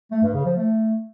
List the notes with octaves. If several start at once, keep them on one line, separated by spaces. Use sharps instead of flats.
A3
G2
C#3
F3
A3